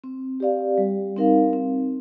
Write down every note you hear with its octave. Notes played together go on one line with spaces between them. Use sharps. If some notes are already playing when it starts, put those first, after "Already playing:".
C4
G4 D5 F5
G3
C4 D#4 A#4 F5
C4